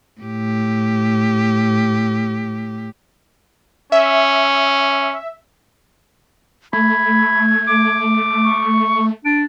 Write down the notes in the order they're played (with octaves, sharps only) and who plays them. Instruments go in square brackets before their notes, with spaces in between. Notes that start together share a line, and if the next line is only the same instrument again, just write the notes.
[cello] A2 G4
[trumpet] C#4 [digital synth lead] E5
[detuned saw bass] A3 [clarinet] B5 [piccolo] G#6
[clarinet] D6
[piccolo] C#6
[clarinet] D4 [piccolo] D7